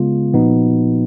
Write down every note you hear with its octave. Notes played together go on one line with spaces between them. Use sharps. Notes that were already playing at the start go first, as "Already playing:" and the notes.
Already playing: C#3 G#3 B3 F4
A#2 F3 B3 D#4 F#4